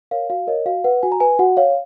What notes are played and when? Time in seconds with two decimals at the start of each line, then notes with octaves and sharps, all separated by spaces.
0.11 A#4 C#5 F5
0.30 F#4 F5
0.47 A#4 C#5 D#5
0.66 F#4 F5
0.84 B4 F#5
1.03 F#4 G#5
1.12 A#5
1.20 B4 G#5
1.39 F#4 F#5
1.57 C#5 F5